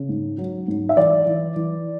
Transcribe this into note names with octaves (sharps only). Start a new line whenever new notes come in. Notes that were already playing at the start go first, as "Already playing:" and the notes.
Already playing: C#3
G#2
F#3
G#2
E5
E3 D5
E3
E3